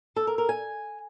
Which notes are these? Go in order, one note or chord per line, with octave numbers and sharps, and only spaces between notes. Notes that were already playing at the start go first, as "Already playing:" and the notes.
A4
A#4
A#4
G#5